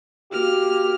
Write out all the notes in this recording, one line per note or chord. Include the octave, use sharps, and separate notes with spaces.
A#3 F#4 G4 F6